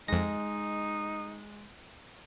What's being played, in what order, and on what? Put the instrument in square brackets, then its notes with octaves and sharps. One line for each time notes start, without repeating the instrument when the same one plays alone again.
[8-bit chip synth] F2 A#6 [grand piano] G#3 [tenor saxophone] D#4